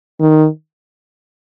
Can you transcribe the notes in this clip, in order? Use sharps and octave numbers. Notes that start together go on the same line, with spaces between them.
D#3